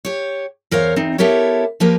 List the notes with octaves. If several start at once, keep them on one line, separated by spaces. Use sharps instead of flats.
G4 C#5
E2 A#4 C5 C#5 F5
E2 C4 D#4
B3 E4 G4 A4 A#4 C#5
F3 A#3 G4 A#4 B4